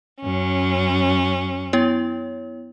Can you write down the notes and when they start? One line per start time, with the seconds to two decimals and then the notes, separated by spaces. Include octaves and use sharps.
0.20 F#2 C#4
1.73 B3 E4 C#5